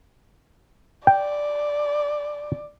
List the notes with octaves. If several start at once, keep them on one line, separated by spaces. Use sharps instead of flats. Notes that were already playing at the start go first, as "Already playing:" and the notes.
D5 G5